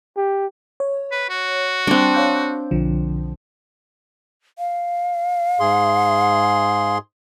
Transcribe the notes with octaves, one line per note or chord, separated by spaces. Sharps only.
G4
C#5
B4
F#4
G3 C4 D4
C#5 F5 G6
B1 D3 F3
F5
G#2 G#4 C6